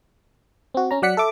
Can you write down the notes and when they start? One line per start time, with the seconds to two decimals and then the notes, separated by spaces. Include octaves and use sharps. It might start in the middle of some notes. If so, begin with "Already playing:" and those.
0.74 C4 F#4
0.91 C#4 A#5
1.02 F#3 D5 F#5 B6 C#7
1.17 A4 E5 D6